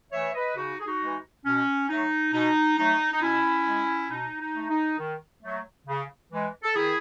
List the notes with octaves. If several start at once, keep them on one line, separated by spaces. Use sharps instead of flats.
E3 A3 C#5 E5
B4 D#5
C#3 D#4 F#4
G#4
D#4 F#4
E3 G#3
B2 C#4
F#3 A3 D#4
B2 D#4
F#3 A3 D#4
D#4
B2 C#4 E4
G#3
B2 D#4
D#4
A3
D#4
D#3
F#3 A3
C#3
E3 G#3
A4
D#3 E4 G#4